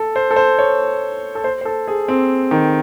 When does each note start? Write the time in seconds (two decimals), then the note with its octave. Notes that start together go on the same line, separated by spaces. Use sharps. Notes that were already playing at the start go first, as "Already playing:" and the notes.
Already playing: A4
0.16 C5
0.31 A4
0.36 C5
0.58 C#5
1.35 A4
1.44 C5
1.61 C5
1.65 A4
1.88 G#4
2.08 C4
2.51 D#3